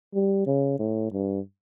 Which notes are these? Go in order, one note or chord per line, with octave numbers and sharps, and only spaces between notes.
G3
C#3
A2
G2